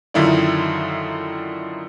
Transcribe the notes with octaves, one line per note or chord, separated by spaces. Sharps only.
F#2 D3 D#3 E4 F4 D5